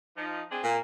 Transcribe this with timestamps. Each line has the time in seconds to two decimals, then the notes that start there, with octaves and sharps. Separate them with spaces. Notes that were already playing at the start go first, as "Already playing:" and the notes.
0.17 F3 D#4
0.51 C4 D4 G#4
0.64 A#2 A#3